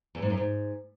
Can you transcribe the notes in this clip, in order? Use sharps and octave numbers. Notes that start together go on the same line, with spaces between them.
E2
G#2
F#2
G#2